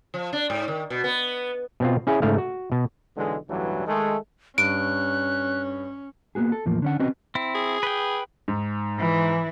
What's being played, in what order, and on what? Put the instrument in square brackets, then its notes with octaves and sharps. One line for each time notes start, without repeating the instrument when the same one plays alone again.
[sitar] F3
D4
G#2
D#3
B2
B3
[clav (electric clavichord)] B2 C4 F4
C#4 E4 G#4
G#2 C#3 A3 F5
F#4
B2
[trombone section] B1 D3 E3 G#3
A1 D2 G2 D3 E3 F#3
D#3 G#3 A3
[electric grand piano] G2 [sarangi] C#4 [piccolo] F#6 [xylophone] D7
[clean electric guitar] A#3 B3 F#4 G#4
A4
E2 A2 F3 A#3
D3 C#4 F#5
C4 C#4 F#4 B4 D#5
[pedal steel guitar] C4 E4
[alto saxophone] G#4
[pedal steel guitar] B4 G5
[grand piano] G#2
[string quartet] E3 E4